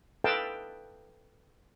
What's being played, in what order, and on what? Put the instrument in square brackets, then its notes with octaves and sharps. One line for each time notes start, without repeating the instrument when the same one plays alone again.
[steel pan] A4 B4 D#5 F5 G5 A5